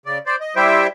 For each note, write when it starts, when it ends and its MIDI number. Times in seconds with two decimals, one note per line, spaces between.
0.06 0.18 49
0.06 0.18 74
0.26 0.36 72
0.26 0.36 74
0.41 0.55 75
0.56 0.87 55
0.56 0.87 64
0.56 0.87 67
0.56 0.87 72
0.56 0.87 76
0.56 0.87 79